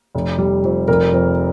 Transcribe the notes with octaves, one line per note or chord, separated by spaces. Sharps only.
F1
G3
F2
F1 A#4
F2